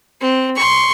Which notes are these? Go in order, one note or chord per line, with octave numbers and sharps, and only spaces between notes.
C4
C6 C#6